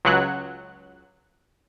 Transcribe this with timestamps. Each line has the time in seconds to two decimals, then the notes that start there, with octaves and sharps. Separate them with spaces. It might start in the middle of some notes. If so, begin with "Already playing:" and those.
0.05 C#2 F#3 F#6